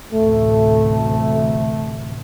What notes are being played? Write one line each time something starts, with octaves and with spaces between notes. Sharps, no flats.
A1 D2 C3 A3